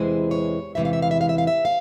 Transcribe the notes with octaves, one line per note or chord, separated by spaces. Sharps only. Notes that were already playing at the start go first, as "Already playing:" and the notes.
Already playing: E2 C3 E3 G#3 C5
C#5
E2 C3 E3 G#3 E5
F5
E5
F5
E5
F5
E5
F5
E5
F5